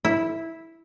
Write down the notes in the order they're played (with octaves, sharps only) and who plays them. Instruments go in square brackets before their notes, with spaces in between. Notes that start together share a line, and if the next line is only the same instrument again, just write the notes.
[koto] E4